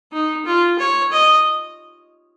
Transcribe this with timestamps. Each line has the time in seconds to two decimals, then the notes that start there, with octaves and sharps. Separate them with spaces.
0.12 D#4
0.46 F4
0.79 C#5
1.12 D#5